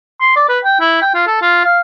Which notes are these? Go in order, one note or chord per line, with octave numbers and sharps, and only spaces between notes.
C6
D5
B4
G5
E4
G5
F4
A4
F4
F5